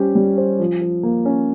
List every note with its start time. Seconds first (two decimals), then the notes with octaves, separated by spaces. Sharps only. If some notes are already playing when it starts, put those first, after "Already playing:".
Already playing: G3 C#4 G4 C5
0.15 G3
0.38 C5
0.60 F3
0.81 F3
1.03 A#3
1.26 C#4